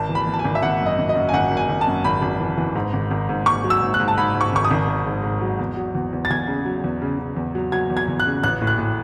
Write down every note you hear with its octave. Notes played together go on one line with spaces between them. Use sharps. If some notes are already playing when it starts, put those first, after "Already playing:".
Already playing: G#1 A5
E3
B5
E3
A5
G#5
G#1
E5
G#1 F#5
F#2
D#5
G#1
D#5
F#2
G#5
G#1 F#5
G#1
G#5
G#1
A5
F#2
G#1 B5
G#1
E3
E3
G#2
G#1
G#1
G#2
G#2 C#6
F#3
E6
G#2
F#6
G#2
A5
G#2 B5
G#2
C#6
G#1 C#6
D#6
G#1
G#1
G#2
G#2
F#3
E2
F#3
E2
E2
A6
E2 G#6
C#3
F#3
E2
C#3
C#3
E2
F#3
F#3 G#6
E2
G#6
E2
F#6
C#3
A1 F#6
A2
F#6
A2